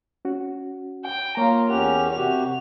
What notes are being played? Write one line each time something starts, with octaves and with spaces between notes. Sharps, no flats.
C#4 F#4
G5
A#3 F4 C#5 A#5
E2 C#4 G4 A#4 F#5 F7
C3 F#4 G4